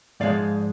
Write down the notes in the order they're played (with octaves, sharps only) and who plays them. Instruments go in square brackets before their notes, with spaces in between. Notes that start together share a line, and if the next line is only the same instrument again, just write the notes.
[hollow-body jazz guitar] G#2 F3 G#3 D5 F5